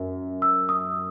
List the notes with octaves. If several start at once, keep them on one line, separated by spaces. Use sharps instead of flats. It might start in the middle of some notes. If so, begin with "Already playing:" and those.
Already playing: F#2
E6
D#6